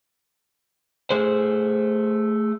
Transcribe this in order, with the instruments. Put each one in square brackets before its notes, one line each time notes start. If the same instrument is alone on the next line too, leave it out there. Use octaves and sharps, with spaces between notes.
[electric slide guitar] A3 G#4 C5